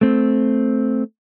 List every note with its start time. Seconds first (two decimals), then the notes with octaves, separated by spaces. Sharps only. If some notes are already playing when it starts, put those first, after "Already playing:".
0.01 A3 C4